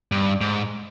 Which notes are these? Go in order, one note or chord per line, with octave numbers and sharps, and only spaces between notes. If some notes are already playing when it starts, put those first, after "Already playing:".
G2
G#2